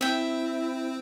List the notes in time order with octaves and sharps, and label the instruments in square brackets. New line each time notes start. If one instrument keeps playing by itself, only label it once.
[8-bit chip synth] C4 [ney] E4 [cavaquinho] E5 G5